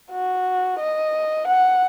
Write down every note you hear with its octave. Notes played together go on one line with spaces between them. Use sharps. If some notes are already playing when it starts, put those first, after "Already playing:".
F#4
D#5
F#5